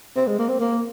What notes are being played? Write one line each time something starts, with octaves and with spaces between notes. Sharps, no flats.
C4
G#3
A#3
C4
A#3